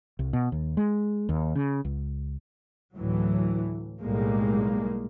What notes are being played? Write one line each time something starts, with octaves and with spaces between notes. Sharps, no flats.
C2
B2
D#2
G#3
D#2
C#3
C#2
D2 A2 E3 F#3
B1 A2 G3 G#3 A#3